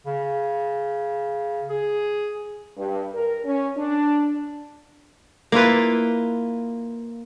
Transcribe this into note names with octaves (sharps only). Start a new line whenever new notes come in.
C#3
G#4
G2
A#4
C#4
D4
A#3 E4 F4 B4